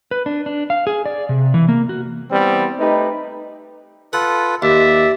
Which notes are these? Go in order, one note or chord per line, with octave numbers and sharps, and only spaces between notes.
B4
D4
D4
F5
G#4
D5
C3
E3
A#3
F#4
E3 G3 B3 C4
A3 D#4 G4 B4
F4 A4 B4 F#5
D#2 D5 E5